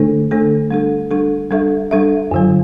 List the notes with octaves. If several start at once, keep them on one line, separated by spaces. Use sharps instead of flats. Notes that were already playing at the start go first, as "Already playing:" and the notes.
Already playing: D3 A3 D4 A4
D3 A3 D4 A4
G3 D4 A4
G3 D4 A4
G3 D4 A4 E5
G3 D4 A4 E5
F#2 D3 F#3